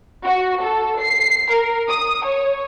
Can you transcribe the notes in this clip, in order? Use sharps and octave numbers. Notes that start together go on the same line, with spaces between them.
F#4
A4
C7
A#4
D#6
C#5